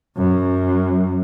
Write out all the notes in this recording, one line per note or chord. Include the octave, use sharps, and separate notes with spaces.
F#2